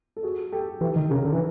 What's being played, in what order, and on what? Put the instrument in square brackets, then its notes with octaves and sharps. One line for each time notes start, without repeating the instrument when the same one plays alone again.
[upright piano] A4
F#4 G#4
G4 A4
[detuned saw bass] E3 [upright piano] G4 A4
[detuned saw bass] D#3
[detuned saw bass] C#3 [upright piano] G#4 A#4
[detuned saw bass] D3
E3